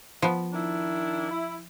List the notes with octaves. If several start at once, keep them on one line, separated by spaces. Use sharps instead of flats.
F3 B3
D#3 D4 E4
E4